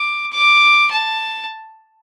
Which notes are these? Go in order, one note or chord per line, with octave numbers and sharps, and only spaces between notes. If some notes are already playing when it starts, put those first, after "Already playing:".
Already playing: D6
D6
A5